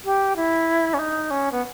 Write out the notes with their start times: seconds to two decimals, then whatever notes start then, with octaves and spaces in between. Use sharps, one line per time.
0.05 G4
0.36 E4
0.94 C#4
0.99 D#4
1.31 C#4
1.52 B3